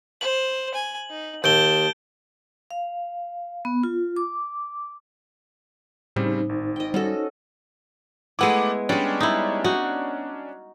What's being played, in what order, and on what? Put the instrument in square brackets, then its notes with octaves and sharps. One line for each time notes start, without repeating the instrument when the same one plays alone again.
[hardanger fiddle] C5 [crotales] F#7
[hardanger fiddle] G#5
D#4
[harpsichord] D#2 [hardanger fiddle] A5 [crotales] G6 D7 G7
[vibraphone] F5
B3
F4
D6
[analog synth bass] A2 [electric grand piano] C#3 G3 C4 [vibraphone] D#4 C5
[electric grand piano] G#1
[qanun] D#5 G5
[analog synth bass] G3 [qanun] C#4 F#4 A4
[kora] G#3 B3 E4 [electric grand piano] A3 F#5 D6
[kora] G3 G#3 [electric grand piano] C#4 D4
[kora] D#4 E4
D#4 F#4